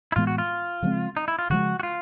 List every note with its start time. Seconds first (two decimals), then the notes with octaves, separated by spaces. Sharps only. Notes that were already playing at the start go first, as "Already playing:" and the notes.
0.12 E4
0.16 A2 E3 G#3 B3 F4
0.27 F#4
0.38 F4
0.83 C#3 F3 G#3 C4
1.17 D#4
1.28 E4
1.39 F4
1.50 C#3 F3 G#3 F#4
1.80 F#4
1.83 F4